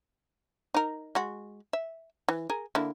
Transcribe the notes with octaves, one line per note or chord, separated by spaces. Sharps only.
D#4 A#4
G#3 F#4
E5
E3
G#4 A#4
D3 A#3 E4